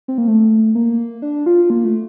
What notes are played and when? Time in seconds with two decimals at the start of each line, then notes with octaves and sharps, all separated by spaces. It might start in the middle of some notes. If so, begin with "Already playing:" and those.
0.08 C4
0.18 A#3
0.28 A3
0.75 A#3
1.22 D4
1.46 F4
1.70 A#3
1.85 A3